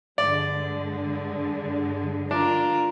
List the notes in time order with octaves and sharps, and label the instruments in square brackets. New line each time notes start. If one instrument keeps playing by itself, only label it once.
[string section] G2 D3 G#3 [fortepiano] D5
[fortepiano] D4 [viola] F4 A#4